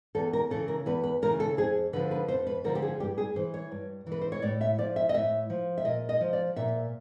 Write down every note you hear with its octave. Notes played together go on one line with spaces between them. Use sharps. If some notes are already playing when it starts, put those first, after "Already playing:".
E2 A4
A#4
C#3 E3 A4
A#4
E2 B4
B4
C#3 E3 A#4
A4
F2 G#4
D3 F3 B4
B4
F2 C5
B4
D3 F3 A#4
G4
G#4
G2 G4
G#4
E3 C5
C#5
G2
E3
B4
C5
C#5
A2 D5
E5
F3 D5
E5
D#5
A2 E5
F3
E5
A#2 D#5
D#5
F3
D5
A#2 E5